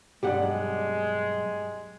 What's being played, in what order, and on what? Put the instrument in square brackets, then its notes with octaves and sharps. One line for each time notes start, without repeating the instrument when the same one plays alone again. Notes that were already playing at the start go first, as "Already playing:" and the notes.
[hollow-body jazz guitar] B1 G2 F#5 [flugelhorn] G#3 [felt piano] G4 D5